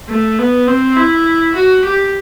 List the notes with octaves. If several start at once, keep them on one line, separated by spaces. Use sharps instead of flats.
A3
B3
C4
E4
F#4
G4